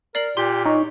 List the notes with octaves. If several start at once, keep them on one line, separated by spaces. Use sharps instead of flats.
A#4 D5 C7 F#7
A#2 G4 C6
D#4 C#5